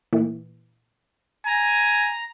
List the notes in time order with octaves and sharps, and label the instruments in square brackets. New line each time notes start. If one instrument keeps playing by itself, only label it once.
[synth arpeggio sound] A#2 E3
[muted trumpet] G#5 [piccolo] A#5